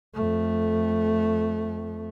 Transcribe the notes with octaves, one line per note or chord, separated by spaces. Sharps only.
F2 A3